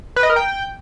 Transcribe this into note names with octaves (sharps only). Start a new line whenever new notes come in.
B4
D#5
A#4
G5